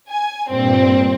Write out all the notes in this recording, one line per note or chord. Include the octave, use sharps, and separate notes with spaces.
G#5
G2 A#2 C4